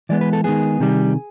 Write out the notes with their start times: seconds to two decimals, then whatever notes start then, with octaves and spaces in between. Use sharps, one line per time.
0.09 E3 G#3 B3 D5
0.21 B4
0.33 A4
0.44 D#3 G#3 B3 G#4
0.80 C3 D#3 G3